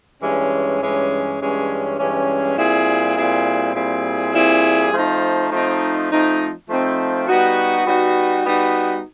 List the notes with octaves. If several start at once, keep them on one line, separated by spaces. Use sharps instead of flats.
G2 E3 G#3 C#4
G2 E3 G#3 C#4
G2 E3 G#3 C#4
G2 E3 G#3 C#4
A#2 G3 C4 E4 G#4
A#2 G3 C4 E4 G#4
A#2 G3 C4 E4 G#4
A#2 G3 C4 E4 G#4
F3 A3 C4 D#4
F3 A3 C4 D#4
F3 A3 C4 D#4
F3 A3 C4 D#4
G3 B3 D#4 F#4
G3 B3 D#4 F#4
G3 B3 D#4 F#4